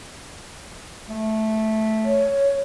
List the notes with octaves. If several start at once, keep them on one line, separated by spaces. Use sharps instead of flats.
A3
C#5